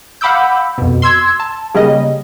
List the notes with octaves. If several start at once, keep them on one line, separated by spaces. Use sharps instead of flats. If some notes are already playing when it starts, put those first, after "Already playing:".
F5 F#5 B5 D6 E6 G6
F2 B2
C6 E6 G#6
A5
C#3 G3 A#3 D#5